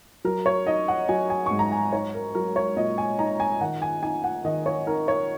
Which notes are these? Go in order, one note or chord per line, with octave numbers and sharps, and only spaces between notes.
F#3 A#4
C#5
D#4 D#5
F#5
F#3 G#5
G#5
G#2 C#6
A#5
G#5
D#4 C#5
A#4
F#3 A#4
C#5
A#2 D#5
G#5
D#4 A#5
G#5
D#3 F#5
G#5
D#4 G#5
F#5
D#3 D#5
C#5
D#4 A#4
C#5